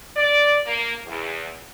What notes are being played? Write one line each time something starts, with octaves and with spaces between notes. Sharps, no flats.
D5
A#3
E2